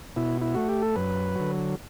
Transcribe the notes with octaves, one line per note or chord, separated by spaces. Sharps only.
B2 E4
E4
A3 F#4
G4
A4
F#2 B4
D3 F#3